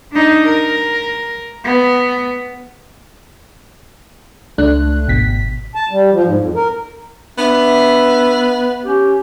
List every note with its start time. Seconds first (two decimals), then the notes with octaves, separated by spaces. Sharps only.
0.12 D4 D#4
0.45 A#4
1.65 B3
4.58 C#2 A3 D4 F#6
5.08 G#1 B2 B6
5.75 A5
5.91 G3
6.12 F3
6.25 G#2
6.40 F2
6.56 A#4
7.38 B3 D4 E5
8.84 C#4 G4